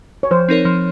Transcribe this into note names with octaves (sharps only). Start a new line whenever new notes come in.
C#5
F3 C5
C4 D#4 A#4 C#5
F3